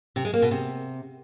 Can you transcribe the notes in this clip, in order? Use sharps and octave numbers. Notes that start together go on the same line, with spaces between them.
C3
G#3
A#3
B2
C3